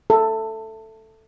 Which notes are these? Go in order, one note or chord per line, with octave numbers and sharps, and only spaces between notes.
A4